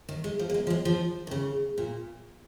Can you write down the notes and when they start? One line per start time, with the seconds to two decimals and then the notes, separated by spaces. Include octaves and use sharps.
0.09 D#3
0.24 G#3
0.39 F3
0.50 A#3
0.54 G#3
0.67 F3
0.70 G#3
0.85 F3
1.27 D#3
1.31 C#3
1.78 A#2